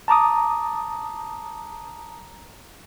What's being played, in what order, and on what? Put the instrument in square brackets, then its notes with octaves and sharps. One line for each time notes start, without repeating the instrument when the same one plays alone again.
[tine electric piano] A5 A#5 D6 D#6